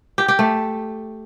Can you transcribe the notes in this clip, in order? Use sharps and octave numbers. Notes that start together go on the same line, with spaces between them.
G4
G4
A3